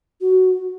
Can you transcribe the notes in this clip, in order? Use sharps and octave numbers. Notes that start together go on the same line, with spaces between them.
F#4